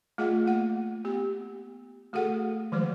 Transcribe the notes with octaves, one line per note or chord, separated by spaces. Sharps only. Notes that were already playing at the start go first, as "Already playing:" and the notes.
A3 F4 G#4 D#5 F#5
A#3 F#5
B3 G4
A3 F#4 G#4 A4 F#5
D#3 F3 G#3 C5